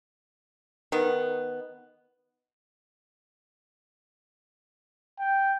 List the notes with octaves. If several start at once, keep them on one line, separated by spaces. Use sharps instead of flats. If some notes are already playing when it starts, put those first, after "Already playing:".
D#3 B3
G5